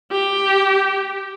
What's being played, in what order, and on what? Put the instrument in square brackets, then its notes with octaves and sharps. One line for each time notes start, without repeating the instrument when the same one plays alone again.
[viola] G4